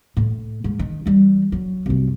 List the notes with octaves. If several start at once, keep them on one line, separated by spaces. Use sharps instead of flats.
A2
G#2
D#3
E3 G3
F#3
C2 F#2